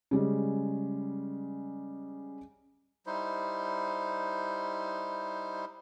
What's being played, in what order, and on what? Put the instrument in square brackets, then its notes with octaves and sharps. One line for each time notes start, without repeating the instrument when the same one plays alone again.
[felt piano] C#3 G3 G#3
[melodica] G3 D#4 E4 C5